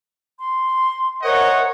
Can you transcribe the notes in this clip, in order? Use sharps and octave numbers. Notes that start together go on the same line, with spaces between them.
C6
A#4 C5 C#5 D#5 E5 F#5